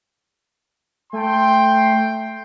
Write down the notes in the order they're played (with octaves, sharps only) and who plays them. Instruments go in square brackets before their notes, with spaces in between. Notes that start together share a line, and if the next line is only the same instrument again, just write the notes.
[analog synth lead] A3 [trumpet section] G5 C6